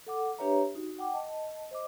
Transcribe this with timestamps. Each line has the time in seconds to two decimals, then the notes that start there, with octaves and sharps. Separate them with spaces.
0.07 A4 F#5 D6
0.39 D4 G4 B4 C#5 E5 A#5
0.75 D#4 F#4
0.99 F#5 G5 D6
1.14 D#5 A5
1.71 C5 D#5 D6